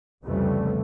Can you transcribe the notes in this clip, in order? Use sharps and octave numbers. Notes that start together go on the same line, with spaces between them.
C2 F2 C#3 E3 G3 A3